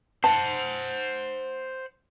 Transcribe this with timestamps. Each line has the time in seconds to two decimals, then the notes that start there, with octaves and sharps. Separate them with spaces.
0.24 C5 F#5 A5